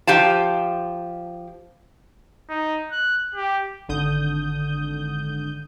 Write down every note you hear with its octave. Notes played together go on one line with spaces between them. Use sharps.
F3 G4 F5 A5
D#4
F#6
G4
G#1 D3 D#6 G6